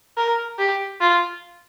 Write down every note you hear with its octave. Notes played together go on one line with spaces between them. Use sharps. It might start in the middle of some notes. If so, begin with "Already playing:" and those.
A#4
G4
F4